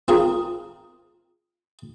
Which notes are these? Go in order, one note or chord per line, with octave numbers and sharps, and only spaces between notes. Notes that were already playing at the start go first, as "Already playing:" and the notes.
C4 F4 G#4 A#4